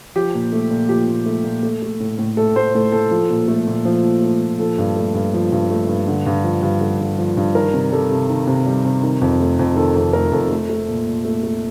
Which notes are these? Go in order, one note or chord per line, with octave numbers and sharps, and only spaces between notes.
F3 G4
A#2
A3
A#2
F3 G4
A#2
A3
A#2
A3
A3
A2
A2
A3 A4
A3 C5
A2 A4
A2 A4
F3
A#2
A3
A#2
F3
A#2
A3
A#2
F3 A4
G2
A3
G2
F3
G2
A3
G2
D3
G2
F3
G2
D3
G2
F3
G2
D#3 A#4
C3
G3 A4
C3
D#3
C3
G3
C3
D#3
F2
A3
F2
D#3 A4
F2
A3 A#4
F2 A4
A3
A3
A#2
A#2
A3
A3